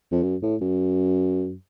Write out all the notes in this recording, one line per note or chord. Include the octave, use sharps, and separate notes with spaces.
F2
F#2
A2
F#2